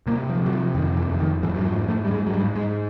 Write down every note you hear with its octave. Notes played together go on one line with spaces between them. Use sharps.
C3 A#3
F3
C3 F#3
F3
F2 D#3
E3
F2
D#3
G#2 E3
F#3
F3
G#2
A3
G3
G#2 G#3
F#3
G3
G#2
G#3